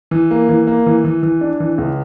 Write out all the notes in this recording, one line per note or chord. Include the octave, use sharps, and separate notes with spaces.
E3
A#3
E3
A#3
E3
E3
E3
D4
E3
C#2